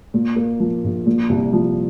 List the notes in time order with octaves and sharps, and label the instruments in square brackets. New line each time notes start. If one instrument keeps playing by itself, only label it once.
[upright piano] A#2
A#3
F3
A#1
A#2
C2
F3